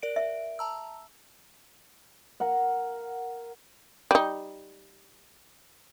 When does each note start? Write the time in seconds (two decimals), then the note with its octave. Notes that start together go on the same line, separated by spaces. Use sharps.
0.02 A#4 D5 D7
0.16 E5
0.59 A5 A#5 E6
2.40 A#4 F5 F#5
4.11 G3 D#4